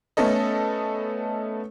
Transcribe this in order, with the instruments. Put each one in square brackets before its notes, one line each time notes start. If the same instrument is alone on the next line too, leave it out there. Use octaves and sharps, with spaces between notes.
[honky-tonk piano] A3 B3 C#4 A4 D#5